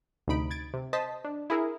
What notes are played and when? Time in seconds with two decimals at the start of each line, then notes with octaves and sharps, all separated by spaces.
0.28 D2 C3 D#4 B5 D7
0.51 G#6 A6 D7
0.74 C3
0.93 C5 D#5 A5 D#6 B6
1.25 D4
1.50 E4 G#4 A#4